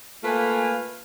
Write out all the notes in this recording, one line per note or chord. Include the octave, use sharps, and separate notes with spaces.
A3 A#3 F4 B4 F5 G#5